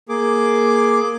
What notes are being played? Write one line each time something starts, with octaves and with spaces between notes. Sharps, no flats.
A#3 G#4 D6